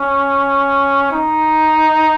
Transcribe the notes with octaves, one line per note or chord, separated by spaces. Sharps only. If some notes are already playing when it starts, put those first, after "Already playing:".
Already playing: C#4
D#4